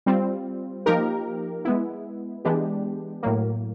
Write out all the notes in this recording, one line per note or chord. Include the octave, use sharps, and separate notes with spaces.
G3 C4 F4
F3 A#3 D#4 G4 A#4
G#3 B3 E4
E3 G#3 B3 D4 G4
A2 F#3 A#3